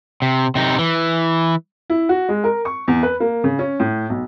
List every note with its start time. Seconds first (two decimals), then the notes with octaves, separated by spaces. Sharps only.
0.22 C3
0.55 C3 D#4
0.79 E3
1.90 E4
2.09 F#4
2.29 G#3
2.44 A#4
2.65 C#6
2.88 E2
3.03 B4
3.20 A#3
3.44 C#3
3.59 C#4
3.80 A2
4.10 B1